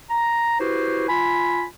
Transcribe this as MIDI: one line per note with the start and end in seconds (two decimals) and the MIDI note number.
0.09 0.57 82
0.59 1.07 64
0.59 1.07 66
0.59 1.07 67
0.59 1.07 71
0.59 1.07 72
1.07 1.64 65
1.07 1.64 80
1.07 1.64 83